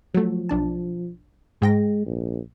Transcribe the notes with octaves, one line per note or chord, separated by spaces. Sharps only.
F3 F#3 A3
B1 D4 A5
G#2 G#3 G5 A#6
A#1